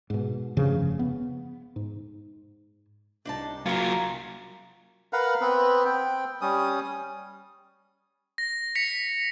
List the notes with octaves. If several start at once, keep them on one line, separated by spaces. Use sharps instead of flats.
G#2 B2
F1 G2 C#3 F3
B3
G#2
C2 D4 D#4 A5
F#3 A#3 F4 A#5
A#4 B4 F5 F#5
B3 C4 B4
C4 G5
G3 C#4 D#6
A#6
B6 C#7 F7